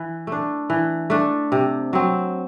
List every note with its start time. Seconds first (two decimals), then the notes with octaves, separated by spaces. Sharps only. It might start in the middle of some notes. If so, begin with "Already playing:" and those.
Already playing: E3
0.27 A3 D4
0.70 E3
1.10 A3 D4
1.52 C3
1.93 F#3 C4